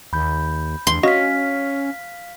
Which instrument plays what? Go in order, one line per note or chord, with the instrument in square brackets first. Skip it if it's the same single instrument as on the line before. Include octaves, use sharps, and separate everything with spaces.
[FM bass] D#2 [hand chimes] B5 G6
[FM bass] E2 [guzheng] C6
[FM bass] C#4 [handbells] F#4 D#5 A#6 [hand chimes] F5 F6 B6